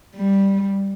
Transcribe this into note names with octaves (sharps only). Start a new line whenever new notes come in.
G3